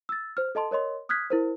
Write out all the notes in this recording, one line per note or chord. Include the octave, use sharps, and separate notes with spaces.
E6 A6
C5 F6
A4 D#5 A5 C6
A#4 C#5 D#5 C6
D#6 F6 F#6 G#6 B6
E4 A#4 C5